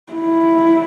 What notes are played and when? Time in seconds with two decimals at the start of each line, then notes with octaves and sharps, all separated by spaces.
0.13 E4